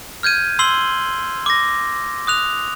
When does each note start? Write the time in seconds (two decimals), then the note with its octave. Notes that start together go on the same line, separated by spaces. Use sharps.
0.23 F6 G6 G#6 D#7
0.59 C6 E6 C7 F#7 G7
1.46 D6 A#6
2.27 D#6 F#6 F7